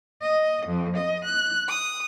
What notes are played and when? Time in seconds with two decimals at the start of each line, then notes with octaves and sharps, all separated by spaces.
0.22 D#5
0.67 F2
0.97 D#5
1.25 F#6
1.68 D#6